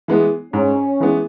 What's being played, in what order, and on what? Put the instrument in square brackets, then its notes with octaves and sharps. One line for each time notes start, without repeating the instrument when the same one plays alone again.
[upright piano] E3 G#3 B3
[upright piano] G#2 [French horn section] C#4
[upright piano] E3 G#3 B3